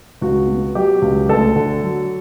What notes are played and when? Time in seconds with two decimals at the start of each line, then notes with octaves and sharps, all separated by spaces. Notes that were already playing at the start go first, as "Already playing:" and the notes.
0.21 C#2 F#4
0.48 B2
0.75 F#3 G4
1.02 C#2
1.29 D2 A4
1.56 D3
1.83 F#3